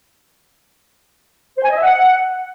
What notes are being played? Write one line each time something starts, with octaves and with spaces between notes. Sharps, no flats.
C5
G#5
D#5
E5
F#5